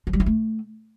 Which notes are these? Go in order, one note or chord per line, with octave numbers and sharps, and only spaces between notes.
F3
G3
E4
A3